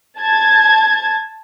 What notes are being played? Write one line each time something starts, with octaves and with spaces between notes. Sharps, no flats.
A5 G#6